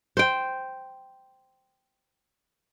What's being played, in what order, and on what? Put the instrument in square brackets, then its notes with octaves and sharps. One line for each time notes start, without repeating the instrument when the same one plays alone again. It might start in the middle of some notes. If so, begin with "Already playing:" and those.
[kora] C5 G5